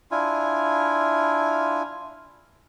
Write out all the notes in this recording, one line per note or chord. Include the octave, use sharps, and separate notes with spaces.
D4 E4 F4 G#5